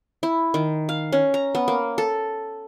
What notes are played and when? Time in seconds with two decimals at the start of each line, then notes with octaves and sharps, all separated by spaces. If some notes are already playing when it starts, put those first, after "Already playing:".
0.23 E4
0.54 D#3
0.89 F5
1.12 C#4
1.34 A#5
1.55 B3
1.68 A#3
1.98 A4